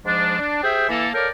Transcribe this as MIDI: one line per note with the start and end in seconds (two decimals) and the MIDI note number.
0.05 0.37 44
0.05 0.37 53
0.05 0.37 56
0.05 0.37 62
0.39 0.62 62
0.63 0.86 67
0.63 0.86 68
0.63 0.86 72
0.63 0.86 76
0.63 0.86 79
0.89 1.08 52
0.89 1.08 58
0.89 1.08 64
0.89 1.08 69
1.14 1.28 69
1.14 1.28 70
1.14 1.28 73
1.14 1.28 74
1.14 1.28 77
1.14 1.28 79